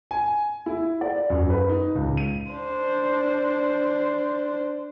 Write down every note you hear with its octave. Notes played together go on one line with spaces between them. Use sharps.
G#5
E4
D5
F#2
B4
D#4
C#2
D#7
D4 C5